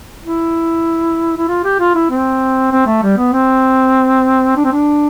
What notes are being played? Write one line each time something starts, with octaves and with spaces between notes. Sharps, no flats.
E4
E4
F4
G4
F4
E4
C4
C4
A3
G3
B3
C4
D4
C4
D4